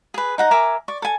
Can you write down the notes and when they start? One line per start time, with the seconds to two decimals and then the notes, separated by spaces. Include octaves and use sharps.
0.14 G#4 B4
0.38 D#4 F#5 A#5
0.51 A#4 E5 G#5 D6
0.88 D5 C#6
1.02 A4 G#5